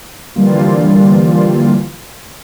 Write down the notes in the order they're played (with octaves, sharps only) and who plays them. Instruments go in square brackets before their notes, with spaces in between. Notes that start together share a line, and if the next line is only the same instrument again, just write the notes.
[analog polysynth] D3 E3 F3 G3 A#3 F4